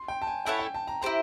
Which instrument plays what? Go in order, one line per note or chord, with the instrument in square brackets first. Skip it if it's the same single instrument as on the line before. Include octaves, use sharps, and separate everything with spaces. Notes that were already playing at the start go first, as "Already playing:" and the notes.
Already playing: [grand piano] C6
G5
A5
G#5
[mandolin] E4 A4 C#5 F#5 [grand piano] G5
[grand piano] G5
A5
A#5
[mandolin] E4 G4 C5 [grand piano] A#5